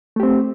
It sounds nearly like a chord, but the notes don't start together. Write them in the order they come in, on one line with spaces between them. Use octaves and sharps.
A3 G4 C4